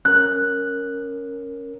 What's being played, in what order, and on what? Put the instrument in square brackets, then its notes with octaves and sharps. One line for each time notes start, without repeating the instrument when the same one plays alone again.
[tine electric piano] C#4 A#4 [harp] F#6